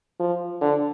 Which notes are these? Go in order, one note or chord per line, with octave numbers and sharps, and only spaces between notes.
F3
D3